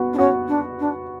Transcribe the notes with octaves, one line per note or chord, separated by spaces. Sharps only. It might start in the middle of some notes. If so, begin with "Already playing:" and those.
Already playing: B3 F#4
D4
C#4 F#4
D4
D4